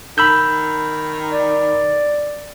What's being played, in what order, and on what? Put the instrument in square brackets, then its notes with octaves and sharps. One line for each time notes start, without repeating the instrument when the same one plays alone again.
[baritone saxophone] D#3 [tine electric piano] B5 E6 G6
[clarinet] D5